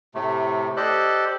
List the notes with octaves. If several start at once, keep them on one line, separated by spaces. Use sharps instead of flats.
A2 C3 A3
G4 A4 C5 D5 D#5 F#6